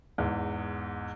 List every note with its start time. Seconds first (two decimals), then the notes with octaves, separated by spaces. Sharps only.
0.18 E2 G#2